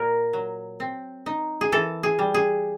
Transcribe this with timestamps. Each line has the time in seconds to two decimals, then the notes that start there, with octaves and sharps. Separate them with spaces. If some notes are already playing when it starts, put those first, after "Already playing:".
Already playing: A#2 A#4
0.33 F#3
0.80 C4
1.26 D#4
1.61 G#4
1.72 E3 A4
2.03 G#4
2.19 G3
2.34 G#4